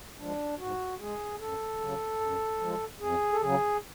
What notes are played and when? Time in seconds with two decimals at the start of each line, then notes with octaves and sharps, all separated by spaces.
0.18 F3 G#3 D4
0.58 G#2 F#4
0.99 G#3 G#4
1.39 F#2 A4
1.80 C#3 F#3
2.21 F#2
2.60 F3 G#3
3.00 F2 G#4
3.33 A4
3.41 C#3 F#3 G#4